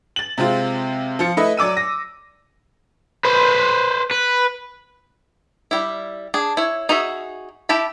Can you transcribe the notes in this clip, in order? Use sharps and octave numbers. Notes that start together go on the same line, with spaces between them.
A6 F#7
C3 G#3 C4 F4
F3 F4 C#7
A3 E4 B4 D#5 E5
F#3 D5 D6 E6 D#7
A#6
B4 C5
B4
G3 E4
D4 G#4
E4 C#5
D#4 F#4 G#4 E5
E4 G4 A5 B5